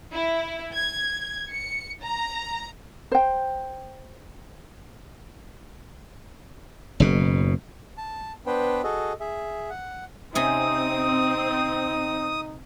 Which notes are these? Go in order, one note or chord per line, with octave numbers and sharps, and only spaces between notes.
E4
G#6
C#7
A#5
C5 G5
F#1 B2
A5
B3 D4 B4 C5 G5
F#4 G#4 A4 D#5
G#4 E5
F#5
C3 C4 C#4 D#4 D#6